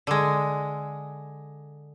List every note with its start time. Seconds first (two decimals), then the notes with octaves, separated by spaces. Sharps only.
0.07 D3 G#3